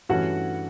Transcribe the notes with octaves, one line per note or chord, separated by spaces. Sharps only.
G2 E3 A3 C#4 F#4 F#5